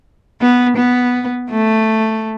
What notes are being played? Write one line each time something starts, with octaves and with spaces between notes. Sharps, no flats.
B3
B3
A3